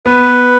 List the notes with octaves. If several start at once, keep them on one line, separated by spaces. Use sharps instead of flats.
B3 B4